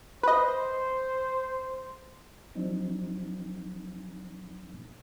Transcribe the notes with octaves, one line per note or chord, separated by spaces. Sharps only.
B4 C5 D#5
F3 F#3 C4 D4 D#4